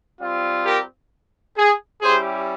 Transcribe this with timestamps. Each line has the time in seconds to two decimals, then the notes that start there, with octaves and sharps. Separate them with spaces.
0.20 G3 C4 F4
0.65 G4 A#4
1.57 G#4
2.02 G3 C#4 E4 G4 G#4 C5